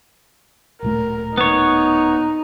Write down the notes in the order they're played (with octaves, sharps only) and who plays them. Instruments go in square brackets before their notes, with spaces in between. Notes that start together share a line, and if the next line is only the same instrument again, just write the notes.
[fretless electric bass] D1 A#2 A3 [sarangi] A#4
[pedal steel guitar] B3 C#5 [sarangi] D#4